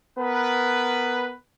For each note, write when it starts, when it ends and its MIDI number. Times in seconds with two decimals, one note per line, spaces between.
0.17 1.33 59
0.17 1.33 70
0.17 1.33 71